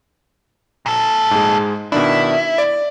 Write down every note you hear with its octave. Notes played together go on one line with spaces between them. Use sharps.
A#2 A4
G#2 G#3
B2 D#3 D4 E4
D5